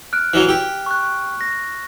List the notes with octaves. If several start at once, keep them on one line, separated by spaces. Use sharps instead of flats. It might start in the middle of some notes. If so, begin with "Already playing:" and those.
F6 F#6 D7
E3 F#3
G4
C#6 F#6
A#6